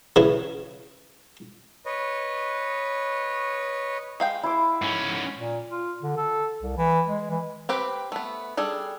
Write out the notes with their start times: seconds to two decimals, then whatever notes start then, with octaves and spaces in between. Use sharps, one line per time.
0.16 C#3 E3
1.86 B4 C#5 D#5
4.20 G#3 F5 G5
4.43 E4 C5 D6
4.82 G#2 C#4
5.38 A#2
5.69 F4
6.02 D3
6.17 A4
6.62 C2
6.77 E3
7.07 G#3
7.30 E3
7.69 C4 G4 B4 C5
8.12 A3 B3
8.57 G3 D4 G#4 A4